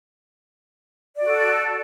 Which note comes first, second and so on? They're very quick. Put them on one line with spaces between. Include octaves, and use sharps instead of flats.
D5 F#4 A4